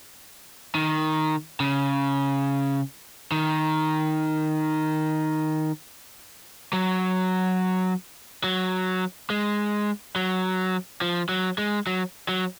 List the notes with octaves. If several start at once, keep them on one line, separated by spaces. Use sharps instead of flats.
D#3
C#3
D#3
F#3
F#3
G#3
F#3
F3
F#3
G#3
F#3
F#3